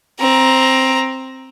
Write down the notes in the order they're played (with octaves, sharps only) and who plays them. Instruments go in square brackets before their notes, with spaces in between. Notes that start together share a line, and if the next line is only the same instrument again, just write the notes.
[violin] C4 A#5